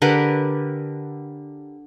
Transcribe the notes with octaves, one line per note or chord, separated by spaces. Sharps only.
D3 G4 A#4 B4